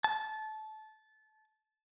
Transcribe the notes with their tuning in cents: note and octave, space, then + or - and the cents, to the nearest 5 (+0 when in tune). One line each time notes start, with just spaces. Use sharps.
A5 -20